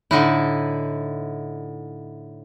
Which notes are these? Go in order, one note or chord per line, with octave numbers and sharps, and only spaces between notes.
A2 D3 D#4 E4